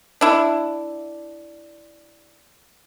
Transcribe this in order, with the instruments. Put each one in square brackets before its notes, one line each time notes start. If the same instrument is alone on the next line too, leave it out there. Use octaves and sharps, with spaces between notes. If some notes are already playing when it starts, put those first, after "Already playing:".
[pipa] D4 E4